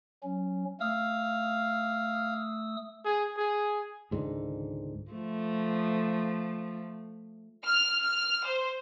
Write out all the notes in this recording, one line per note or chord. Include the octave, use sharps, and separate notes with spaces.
F#3 C#4
A3 F5 D#6 E6
G#4
G#4
C#2 G#2 D3 D#3
F3 A3
F6
F6
C5